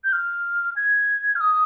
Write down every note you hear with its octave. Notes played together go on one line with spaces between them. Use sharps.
G6
F6
G#6
F6
D#6